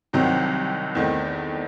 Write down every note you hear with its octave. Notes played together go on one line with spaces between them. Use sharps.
C2 C3 D#3 F#3 C4
E2 D#3 A3 C4